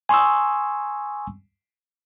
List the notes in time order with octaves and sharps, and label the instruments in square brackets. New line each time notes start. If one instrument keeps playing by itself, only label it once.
[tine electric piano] G#5 C6 C#6 D#6 E6